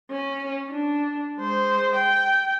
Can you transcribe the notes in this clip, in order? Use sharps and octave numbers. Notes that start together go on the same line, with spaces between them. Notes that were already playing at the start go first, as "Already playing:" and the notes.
C#4
D4
G#3 C5
G5